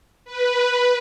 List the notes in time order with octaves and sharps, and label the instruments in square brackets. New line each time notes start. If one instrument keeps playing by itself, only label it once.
[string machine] B4